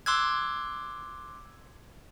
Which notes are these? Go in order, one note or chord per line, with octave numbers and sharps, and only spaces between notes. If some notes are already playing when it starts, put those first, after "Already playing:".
C6 D6 E6 F#6 G#6